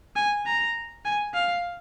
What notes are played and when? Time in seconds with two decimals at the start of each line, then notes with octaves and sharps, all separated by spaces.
0.16 G#5
0.46 A#5
1.05 G#5
1.34 F5